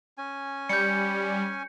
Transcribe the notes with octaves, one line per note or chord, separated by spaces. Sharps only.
C#4 G#5
G3 G6 C#7